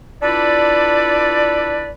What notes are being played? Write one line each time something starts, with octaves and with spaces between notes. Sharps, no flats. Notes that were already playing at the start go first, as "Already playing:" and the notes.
D4 E4 F4 A4 B4 D5